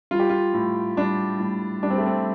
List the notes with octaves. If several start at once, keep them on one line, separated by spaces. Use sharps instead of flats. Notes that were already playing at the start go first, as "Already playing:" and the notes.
G3 F4
G4
F4
A2
G3 D4
A2
G3 D4
C4
A3
C4